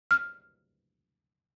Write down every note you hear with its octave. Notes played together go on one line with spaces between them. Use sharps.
F6